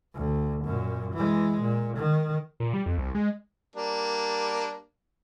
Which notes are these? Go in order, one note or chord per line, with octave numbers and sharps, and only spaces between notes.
D2
F#2 A#2
E3 G#3
A#2
D#3
A#2
G3
F2
C2
G#3
G3 A#3 D4